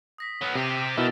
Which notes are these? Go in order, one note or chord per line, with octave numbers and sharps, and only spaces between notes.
D#6 A#6 B6
F#3 B3 F6 F7
C3 C4 G4 D7 D#7
B6
B2 D#3 E4 E6 A6